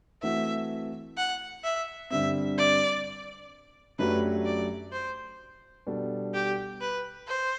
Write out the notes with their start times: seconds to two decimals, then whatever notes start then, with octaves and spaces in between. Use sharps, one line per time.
0.22 E3 A3 C4 F#4 E5
1.17 F#5
1.64 E5
2.10 G2 D3 G3 C4 E5
2.58 D5
3.99 F#2 F#3 A3 D4 G4 B4
4.45 D5
4.92 C5
5.87 B2 G3 D4 A4
6.34 G4
6.81 B4
7.28 C5